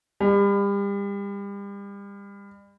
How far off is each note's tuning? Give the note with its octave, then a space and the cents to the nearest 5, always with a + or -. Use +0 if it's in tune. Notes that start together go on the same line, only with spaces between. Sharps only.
G3 +35